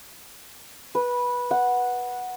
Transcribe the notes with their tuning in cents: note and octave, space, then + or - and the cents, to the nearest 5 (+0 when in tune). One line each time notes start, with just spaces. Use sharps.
B4 -15
F#5 -5